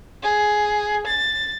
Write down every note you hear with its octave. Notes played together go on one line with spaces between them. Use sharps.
G#4
A6